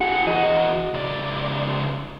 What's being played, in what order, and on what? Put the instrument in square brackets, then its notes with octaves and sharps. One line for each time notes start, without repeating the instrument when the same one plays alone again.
[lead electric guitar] F#4 G#4 [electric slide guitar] F#5
[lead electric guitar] E2 F#4 [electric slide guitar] D#5
[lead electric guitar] C#2 D5